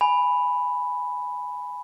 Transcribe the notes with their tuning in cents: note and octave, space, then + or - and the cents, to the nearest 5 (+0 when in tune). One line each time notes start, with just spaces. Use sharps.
G#5 +0 B5 +0